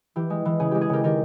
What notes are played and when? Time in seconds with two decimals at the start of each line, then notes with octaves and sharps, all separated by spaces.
0.16 E3 G4
0.30 G#3
0.45 E3
0.60 C#3 G#4
0.71 G#3 G4
0.81 G#4
0.90 C#3 G4 A#4
1.03 D#3 G4 A#4